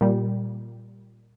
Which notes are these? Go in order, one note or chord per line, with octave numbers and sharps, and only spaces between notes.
A#2 G3